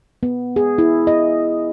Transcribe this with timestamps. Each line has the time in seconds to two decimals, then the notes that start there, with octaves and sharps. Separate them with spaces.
0.23 B3
0.56 G#4
0.78 E4
1.07 D#5